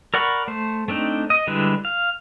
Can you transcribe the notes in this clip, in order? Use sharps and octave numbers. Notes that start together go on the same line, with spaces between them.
A#4 D5 F#5 B5 C#6
A3 C5
A3 C4 D4 D#4
D#5
D3 G3 G#3 E4 B4
F5